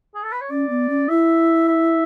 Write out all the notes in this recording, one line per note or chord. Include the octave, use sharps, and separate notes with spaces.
G#4
A4
B4
C#5
C#4 D5
B3
C#4
E4 E5
E5